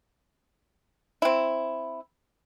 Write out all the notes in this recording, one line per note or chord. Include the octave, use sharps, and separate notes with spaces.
C4 E4